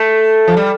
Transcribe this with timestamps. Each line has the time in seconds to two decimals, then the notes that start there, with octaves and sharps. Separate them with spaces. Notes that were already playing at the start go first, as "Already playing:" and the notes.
Already playing: A3
0.48 F3
0.57 G3